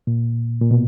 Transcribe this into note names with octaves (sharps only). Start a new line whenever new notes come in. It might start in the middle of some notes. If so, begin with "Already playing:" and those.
A#2
A#2
B2